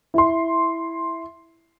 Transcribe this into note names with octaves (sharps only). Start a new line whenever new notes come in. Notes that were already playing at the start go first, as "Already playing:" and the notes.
E4 C6